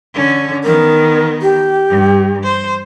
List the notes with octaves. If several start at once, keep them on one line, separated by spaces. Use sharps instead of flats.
D3 C#4
D#3 B3 A#4
G4
G2
C5